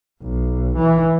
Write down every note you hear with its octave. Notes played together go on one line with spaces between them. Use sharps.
B1
E3